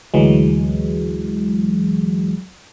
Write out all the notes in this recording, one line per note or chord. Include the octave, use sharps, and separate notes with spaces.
D2 E3 F#3 G#3